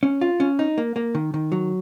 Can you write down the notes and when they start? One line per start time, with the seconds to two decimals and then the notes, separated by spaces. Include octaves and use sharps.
0.03 C#4
0.21 F4
0.40 C#4
0.59 D#4
0.78 A#3
0.96 A#3
1.15 D#3
1.34 D#3
1.52 F#3